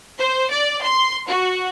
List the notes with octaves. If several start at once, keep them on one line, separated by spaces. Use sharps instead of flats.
C5
D5
C6
F#4